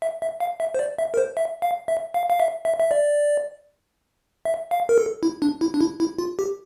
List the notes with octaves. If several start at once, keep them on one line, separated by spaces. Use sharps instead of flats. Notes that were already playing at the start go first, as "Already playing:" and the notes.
E5
E5
F5
E5
C5
D5
E5
A#4
C5
E5
F5
E5
F5
F5
E5
E5
E5
D5
E5
F5
A#4
A4
E4
D4
E4
D4
E4
E4
F4
G4